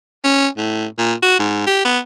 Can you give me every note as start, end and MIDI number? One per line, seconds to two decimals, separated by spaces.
0.24 0.47 61
0.57 0.86 45
0.98 1.13 46
1.22 1.36 66
1.39 1.62 44
1.67 1.84 67
1.85 1.99 59